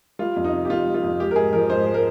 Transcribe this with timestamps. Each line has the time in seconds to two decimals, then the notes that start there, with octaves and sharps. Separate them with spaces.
0.19 G3 F4
0.36 F2
0.44 D#4
0.53 C3
0.65 G4
0.69 F2 F4
0.87 G3
0.94 F4
1.03 F2
1.20 G#3 G4
1.31 A#4
1.36 G#2 G#4
1.53 F3 A#4
1.70 G#2 C5
1.86 G#3
1.94 A#4